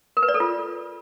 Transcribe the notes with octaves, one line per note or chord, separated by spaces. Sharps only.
A#4
B4
D5
A4
F4